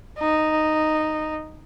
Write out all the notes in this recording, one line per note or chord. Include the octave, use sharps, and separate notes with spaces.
D#4